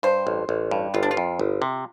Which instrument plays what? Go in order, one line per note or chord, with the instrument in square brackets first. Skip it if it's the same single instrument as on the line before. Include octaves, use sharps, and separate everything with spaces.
[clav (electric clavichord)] G2 [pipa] C5
[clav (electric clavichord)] A1
A1
G2
[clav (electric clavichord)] G1 [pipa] F4
[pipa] D4
F4
[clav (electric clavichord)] F2
G1
C3